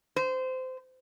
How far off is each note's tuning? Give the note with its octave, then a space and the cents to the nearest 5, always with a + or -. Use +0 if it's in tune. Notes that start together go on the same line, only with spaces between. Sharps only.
C5 -20